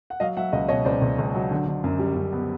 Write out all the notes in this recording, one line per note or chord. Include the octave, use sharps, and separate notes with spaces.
F#5
F#3 D#5 F5
F#3 E5 F#5
C#2 D#5 F5
B2 C#5 D#5
C#2 C5 D5
C#2
C#2
F#3
D3
D3
F#2
G3
F#2
B3